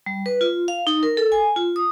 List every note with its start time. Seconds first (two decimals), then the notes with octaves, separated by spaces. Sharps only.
0.06 G3
0.26 B4
0.41 F4
0.68 F5
0.87 D#4
1.03 A#4
1.17 A4
1.32 G#5
1.56 F4
1.76 D#6